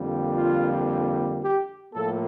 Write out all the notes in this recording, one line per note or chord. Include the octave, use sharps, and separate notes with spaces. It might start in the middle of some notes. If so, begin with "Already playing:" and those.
Already playing: F2 D3 G3 A#3
F4
G4
A2 F3 A#3 A4